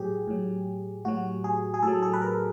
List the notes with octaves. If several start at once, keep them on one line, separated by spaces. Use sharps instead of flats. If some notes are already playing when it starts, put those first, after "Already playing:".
Already playing: A2 F#3 G4 G#4
A2 F#3
A2 F#3 F#4
G#4
G#4
A2 F#3 A4
A4
B4
A#4